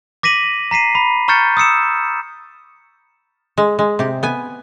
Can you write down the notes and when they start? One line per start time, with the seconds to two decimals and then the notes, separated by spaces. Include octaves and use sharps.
0.23 D6 A#6 B6 D#7 F#7
0.71 A#5 B6 C7 D#7
0.95 B5
1.28 A#5 C#6 F6 G6 A6 C#7
1.57 D#6 E6 C#7 E7
3.58 G#3
3.79 G#3
3.99 C3 G4
4.23 B3 G#5